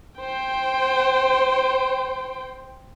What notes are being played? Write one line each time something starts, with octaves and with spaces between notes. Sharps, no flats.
C5 G5